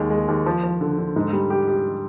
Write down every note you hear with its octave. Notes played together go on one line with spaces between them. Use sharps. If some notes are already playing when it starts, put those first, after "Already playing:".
Already playing: D#2 G#3
G#3
D#2
F3
F3
D3
D3
G#2
G3
G4
G4